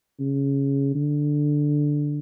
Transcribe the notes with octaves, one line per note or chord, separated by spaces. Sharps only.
C#3
D3